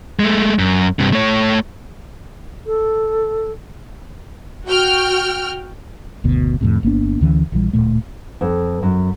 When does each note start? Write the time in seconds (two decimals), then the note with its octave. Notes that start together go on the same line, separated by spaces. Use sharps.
0.19 G#3 A3
0.59 F#2
0.99 G2 C3
1.13 A3 C#5
2.66 A4
4.66 F#4 G5 F6
6.24 F#1 D2 B2
6.61 F2 A2 C3
6.83 G1 A#3 B3 D4
7.21 D2 D3 E3 C#4
7.52 A#1 A#2 E3 G3
7.73 D1 F2 A#2 A3
8.41 F2
8.83 F#2